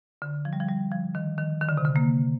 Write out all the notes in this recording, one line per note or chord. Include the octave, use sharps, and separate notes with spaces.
D3
F3
G3
F3
G3
F3
D#3
D#3
D#3
D3
C3
D3
A#3